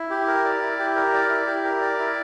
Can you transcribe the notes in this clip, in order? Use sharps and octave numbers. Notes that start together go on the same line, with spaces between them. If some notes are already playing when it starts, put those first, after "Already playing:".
Already playing: E4
G4
A#4
D5
E4
G4
A#4
D5
E4
G4
A#4
D5
E4